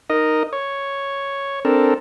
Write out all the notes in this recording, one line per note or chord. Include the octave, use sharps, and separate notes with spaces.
D#4 A#4 D#5
C#5
C4 D4 A4 A#4